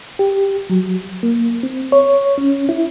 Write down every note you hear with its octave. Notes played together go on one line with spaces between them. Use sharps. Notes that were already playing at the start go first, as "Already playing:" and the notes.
G4
F#3
A#3
C4
C#5
C#4
E4